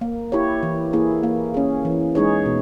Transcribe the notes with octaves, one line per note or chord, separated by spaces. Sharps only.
A#3
E4 G4 C#5
E3
A#3 E4 G#4
A#3
C#4 G#4
E3
G#3 D#4 G#4 C#5
B2